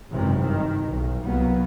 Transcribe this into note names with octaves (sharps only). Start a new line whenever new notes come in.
G#1 F#2 C3 D#3 E3
G2 D#3
B1
C2 F#3 A#3 B3